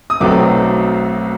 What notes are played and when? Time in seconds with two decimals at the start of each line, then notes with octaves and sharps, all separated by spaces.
0.10 D#6
0.21 B1 B2 F#3 A3 C4 D6